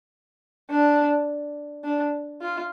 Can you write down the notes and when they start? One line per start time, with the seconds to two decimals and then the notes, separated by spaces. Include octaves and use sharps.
0.70 D4
1.84 D4
2.42 F4